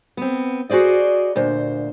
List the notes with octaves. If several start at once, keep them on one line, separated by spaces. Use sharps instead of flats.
B3 C4
F#4 G#4 C5 D5 D#5
D2 A#2 C5